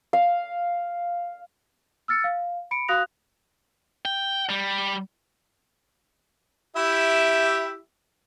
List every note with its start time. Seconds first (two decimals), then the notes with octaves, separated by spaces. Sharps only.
0.13 F5
2.08 E6 F6 A6 C#7
2.24 F5
2.71 B5 C#7 D7
2.88 F#4 F5 D#6 F#6 A#6 F7
4.05 G5
4.50 G3
6.76 E4 G4 E5